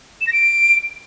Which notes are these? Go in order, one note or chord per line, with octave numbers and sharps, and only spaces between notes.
E7
A#6
D7